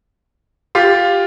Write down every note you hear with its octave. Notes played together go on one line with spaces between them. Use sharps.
F4 G4